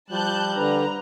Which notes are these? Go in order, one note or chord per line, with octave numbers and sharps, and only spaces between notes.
F3 G3 A5 F#6 G6
D3 D4 B4 A#5